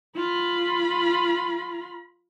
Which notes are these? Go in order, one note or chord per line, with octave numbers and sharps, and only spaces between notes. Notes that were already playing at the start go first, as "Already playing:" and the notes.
F4 B5